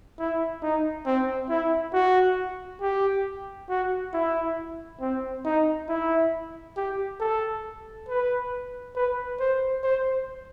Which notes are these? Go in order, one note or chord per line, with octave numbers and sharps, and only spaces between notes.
E4
D#4
C4
E4
F#4
G4
F#4
E4
C4
D#4
E4
G4
A4
B4
B4
C5
C5